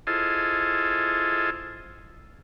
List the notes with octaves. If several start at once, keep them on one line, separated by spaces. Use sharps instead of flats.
E4 F4 G#4 A4 C5 D#5